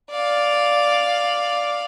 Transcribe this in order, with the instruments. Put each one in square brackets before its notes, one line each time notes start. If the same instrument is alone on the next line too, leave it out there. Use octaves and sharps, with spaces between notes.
[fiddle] D5 F5